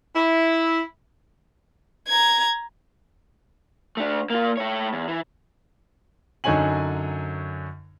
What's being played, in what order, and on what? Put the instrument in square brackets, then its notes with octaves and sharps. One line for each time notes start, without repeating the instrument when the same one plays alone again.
[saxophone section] E4
[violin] A#5 G#6
[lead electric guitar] A3 D4
A#3 F4
A3 C#5
E2
E3
[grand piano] F#2 D3 D#4 C#5 G#5 F#7